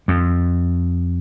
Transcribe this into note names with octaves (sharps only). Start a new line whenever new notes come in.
F2